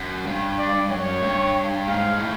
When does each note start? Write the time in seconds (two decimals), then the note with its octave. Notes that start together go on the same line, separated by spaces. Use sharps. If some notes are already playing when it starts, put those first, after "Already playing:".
Already playing: F#2
0.26 G2
0.58 D5
0.90 F#2 C#5
1.22 G2
1.87 G#2 F5
2.19 A2